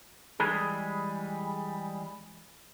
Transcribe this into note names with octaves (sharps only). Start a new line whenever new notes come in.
E3 G3 G#3 G#4